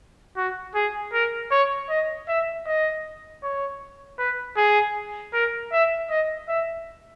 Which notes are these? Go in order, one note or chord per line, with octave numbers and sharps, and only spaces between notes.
F#4
G#4
A#4
C#5
D#5
E5
D#5
C#5
B4
G#4
A#4
E5
D#5
E5